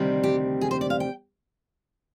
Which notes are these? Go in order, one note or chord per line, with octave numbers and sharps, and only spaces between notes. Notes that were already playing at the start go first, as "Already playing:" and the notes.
Already playing: D2 C3 D#3 G3 C4
G4
G#4
C5
D5
F5
G5